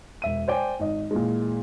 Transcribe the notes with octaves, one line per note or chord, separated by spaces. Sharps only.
E1 E5 D#7
C5 D5 G5 G#5
G#1 D#5
A#2 E3 G#3